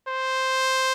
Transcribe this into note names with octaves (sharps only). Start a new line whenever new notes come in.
C5